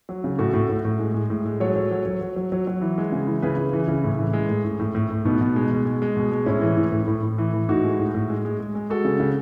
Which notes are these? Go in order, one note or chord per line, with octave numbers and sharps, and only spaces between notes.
F#3
C#3
A2 F#4 A4
A2
A2
A2
G#3
G#3
A2
G#3
F#3 A4 C#5
F#3
F#3
F#3
F#3
F#3
F#3
F#3
E3
G#3
C#3
E3
C#3 G#4 B4
C#3
E3
C#3
A2
E3
G#3
A2
A2
A2
A2
A2
B2 B3 D#4
B2
G#3
B2
G#3
G#3
B2
G#3
A2 C#4 E4
E3
A2
A2
A2
A2
E3
E3
A2 D#4 F#4
G#3
A2
A2
G#3
G#3
G#3
G#3
G#3 F#4 A4
C#3
C#3